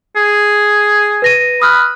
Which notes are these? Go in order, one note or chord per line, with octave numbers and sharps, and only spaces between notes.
G#4
B4 A#6 D#7
B5 D#6 F6 F#6